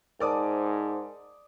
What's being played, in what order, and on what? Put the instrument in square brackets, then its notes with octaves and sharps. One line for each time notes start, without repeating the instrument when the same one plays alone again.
[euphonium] G#2 [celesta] A#4 C5 A5 [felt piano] D5 D6 D#6